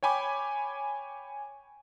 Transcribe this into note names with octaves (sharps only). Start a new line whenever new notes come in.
C#5 G5 G#5 B5 D6